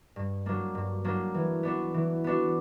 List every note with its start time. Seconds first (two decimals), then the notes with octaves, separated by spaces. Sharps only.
0.16 G2
0.46 F#3 A#3 D4
0.75 G2
1.04 F#3 A#3 D4
1.34 E3
1.63 B3 D4 F#4
1.94 E3
2.24 B3 D4 F#4